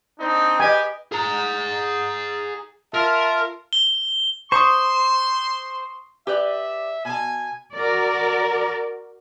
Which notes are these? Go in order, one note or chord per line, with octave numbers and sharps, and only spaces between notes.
C4 D4 D#4
G4 B4 D#5 G5 G#5
G#4 A#5
F4 A#4 E5 A5
G7
C5 C6 C#6 D#6
G4 B4 D5 E5
B2 G#5 A5
F#4 A#4 D5